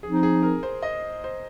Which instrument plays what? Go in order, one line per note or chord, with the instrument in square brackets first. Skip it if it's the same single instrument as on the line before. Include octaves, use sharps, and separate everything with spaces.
[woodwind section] F3 C4 D#4 [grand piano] G#4
[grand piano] G#4
A#4
C5
D#5
C5